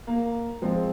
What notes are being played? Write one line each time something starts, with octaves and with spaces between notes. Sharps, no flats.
A#3
F3 G#3 C4